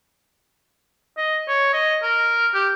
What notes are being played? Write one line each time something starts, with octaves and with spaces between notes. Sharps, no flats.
D#5
C#5
D#5
A#4
G4